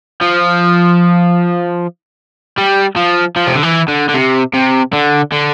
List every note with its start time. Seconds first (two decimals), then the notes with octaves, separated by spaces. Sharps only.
0.22 F3
2.58 G3
2.96 F3
3.36 F3
3.47 C3
3.55 D3
3.63 E3
3.88 D3
4.09 D3
4.15 C3
4.54 C3
4.93 D3
5.32 D3